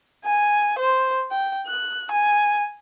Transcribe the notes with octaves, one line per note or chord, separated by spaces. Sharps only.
G#5
C5
G5
F#6
G#5